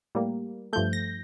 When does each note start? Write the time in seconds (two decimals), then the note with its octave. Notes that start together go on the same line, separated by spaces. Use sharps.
0.15 A2 G3 A#3
0.73 G2 F3 A3 G6
0.93 A#6